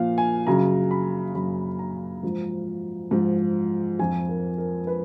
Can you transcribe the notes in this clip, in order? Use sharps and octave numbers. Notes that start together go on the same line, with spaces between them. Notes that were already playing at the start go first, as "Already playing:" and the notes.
Already playing: A#2 F3 F5
G#5
F#2 C#3 F#3 A#5
B5
F#2 C#3 F#3 B5
A#5
G#2 F3
G#2 F3
F2 F3 G#5
A#4
A#4
B4